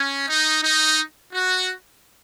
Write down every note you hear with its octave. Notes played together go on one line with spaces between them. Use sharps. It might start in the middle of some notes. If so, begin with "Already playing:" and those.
Already playing: C#4
D#4
D#4
F#4